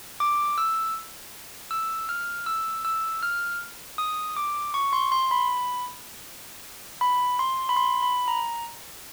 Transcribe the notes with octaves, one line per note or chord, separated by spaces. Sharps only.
D6
E6
E6
F6
E6
E6
F6
D#6
D6
C#6
C6
C6
B5
B5
C6
B5
C6
B5
A#5